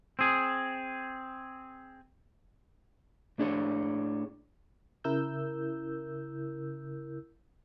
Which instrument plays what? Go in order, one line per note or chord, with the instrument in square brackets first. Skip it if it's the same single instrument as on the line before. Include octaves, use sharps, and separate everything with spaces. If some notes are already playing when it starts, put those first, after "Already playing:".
[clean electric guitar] C4 G#4
A2 D4 G#4 C#5
[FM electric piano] C#3 E4 A#4 E6 G6